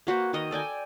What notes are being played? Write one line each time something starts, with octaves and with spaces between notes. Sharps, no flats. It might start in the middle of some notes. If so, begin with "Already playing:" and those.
A#3 F#4 B4 C5
D#3 F#4 A#4 D#5
A4 D5 G5 G#5